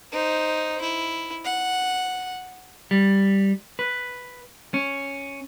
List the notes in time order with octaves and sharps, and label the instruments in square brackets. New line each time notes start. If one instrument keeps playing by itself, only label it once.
[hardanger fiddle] D#4 C5
E4
F#5
[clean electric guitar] G3
B4
C#4